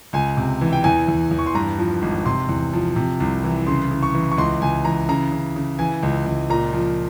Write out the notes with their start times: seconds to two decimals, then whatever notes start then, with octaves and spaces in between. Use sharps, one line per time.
0.13 C#2 G#5
0.37 C3
0.61 E3
0.73 G5
0.84 E2 G#5
1.08 E2
1.31 E2
1.39 C#6
1.46 C6
1.55 G2 A#5
1.78 F3
2.02 G#1
2.26 C3 C6
2.49 E2
2.73 F3
2.96 C3
3.20 C2
3.44 E3
3.67 C#3 C6
3.91 C#3
4.03 C#6
4.15 E3
4.32 C#6
4.38 C#2 C6
4.61 C#2 G#5
4.85 E3 A#5
5.09 C#3 A#5
5.32 C#3
5.56 C#3
5.79 E3 G#5
6.03 C#2
6.26 C#2
6.50 A#2 A#5
6.73 F3